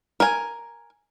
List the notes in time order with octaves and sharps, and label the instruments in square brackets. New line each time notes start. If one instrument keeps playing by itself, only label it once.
[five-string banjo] A#4 G#5